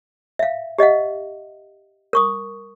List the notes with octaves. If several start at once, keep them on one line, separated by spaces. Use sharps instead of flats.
E5 F5
G4 D#5 E5 F#5
A#4 C#6 D#6